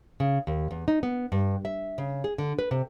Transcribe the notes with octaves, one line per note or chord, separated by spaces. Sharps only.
C#3
D#2
E2
D#4
B3
G2
E5
C#3
G#4
D3
B4
C3